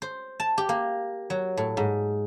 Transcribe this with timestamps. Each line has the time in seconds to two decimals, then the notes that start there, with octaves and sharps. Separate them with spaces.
0.02 C5
0.40 A5
0.58 G4
0.69 A#3
1.30 F#3
1.57 A2
1.77 G#2